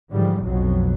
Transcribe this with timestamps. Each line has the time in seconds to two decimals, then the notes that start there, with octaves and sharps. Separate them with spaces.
0.12 G#2 D3 E3 F3 G3
0.43 F1 B1 F2 B2 F#3